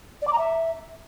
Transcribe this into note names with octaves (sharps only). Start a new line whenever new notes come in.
D5
D6
A#5
E5